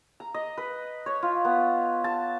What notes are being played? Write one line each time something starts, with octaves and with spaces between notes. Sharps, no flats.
A#5
D#5
B4
C#5
F4
B3
A5